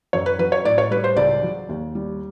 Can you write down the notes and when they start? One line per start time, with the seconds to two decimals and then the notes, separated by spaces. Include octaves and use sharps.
0.13 F#2 C#5
0.26 B4
0.39 F#3 B4
0.52 C#5
0.65 A2 D5
0.78 C#5
0.91 G3 B4
1.04 C5
1.16 C#2 D5
1.43 F#3
1.69 D#2
1.95 G3